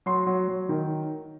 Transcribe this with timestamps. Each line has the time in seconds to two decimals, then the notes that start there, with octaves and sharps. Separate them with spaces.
0.06 F#3 C6
0.27 F#3
0.48 F#3
0.69 D#3